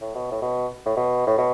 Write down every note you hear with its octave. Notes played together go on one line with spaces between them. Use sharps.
A2
B2
A2
B2
A2
B2
A2
B2